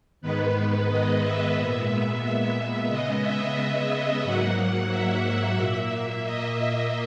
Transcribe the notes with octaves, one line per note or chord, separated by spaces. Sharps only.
G#2 D#3 G#3 B3 B4
D#5
E5
A#2 G#3 B3
E5
E5
C#3 G#3 B3 D#5
E5
E5
G#2 F#3 A#3 F#5
E5
A#2
A#3
D#5